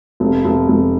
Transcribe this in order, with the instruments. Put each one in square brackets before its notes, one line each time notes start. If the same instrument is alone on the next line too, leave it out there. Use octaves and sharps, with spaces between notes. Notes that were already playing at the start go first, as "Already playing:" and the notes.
[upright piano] F1
F1
F1